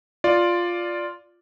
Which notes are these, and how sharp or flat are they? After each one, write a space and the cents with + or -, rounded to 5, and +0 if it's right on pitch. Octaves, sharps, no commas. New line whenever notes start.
F4 +0 D5 +0